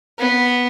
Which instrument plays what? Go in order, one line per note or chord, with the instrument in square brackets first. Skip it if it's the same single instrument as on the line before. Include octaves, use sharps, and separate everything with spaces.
[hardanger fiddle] B3